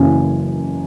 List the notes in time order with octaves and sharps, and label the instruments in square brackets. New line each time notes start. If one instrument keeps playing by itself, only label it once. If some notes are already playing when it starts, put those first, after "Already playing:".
Already playing: [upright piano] F#1 F#2 C#3 E3 G#5